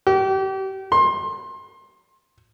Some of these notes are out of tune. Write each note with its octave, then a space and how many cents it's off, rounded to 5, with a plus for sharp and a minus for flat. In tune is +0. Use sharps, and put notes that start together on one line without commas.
G4 -35
C6 +25